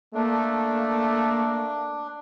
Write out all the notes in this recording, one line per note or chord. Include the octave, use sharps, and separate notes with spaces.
A3 A#3 D4